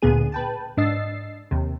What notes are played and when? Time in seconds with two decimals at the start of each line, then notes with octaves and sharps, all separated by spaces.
0.02 D2 A#2 D3 B3 G#4 D#7
0.32 B4 G5 A5
0.77 G#2 D4 D#5 E6 A6 C7
1.51 D#2 C3